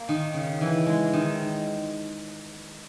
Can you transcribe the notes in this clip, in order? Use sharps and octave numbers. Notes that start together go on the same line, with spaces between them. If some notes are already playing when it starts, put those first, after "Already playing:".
Already playing: A#3
D#3
C#3
E3
G#3
D#3